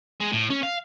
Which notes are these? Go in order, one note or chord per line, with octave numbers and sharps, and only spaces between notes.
G#3
A2
C#4
F5